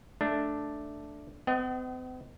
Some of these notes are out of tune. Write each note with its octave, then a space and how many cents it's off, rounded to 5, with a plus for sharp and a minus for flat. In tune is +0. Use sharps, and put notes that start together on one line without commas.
A3 +0 D4 +0
C4 -45 D#5 +0 F#5 +45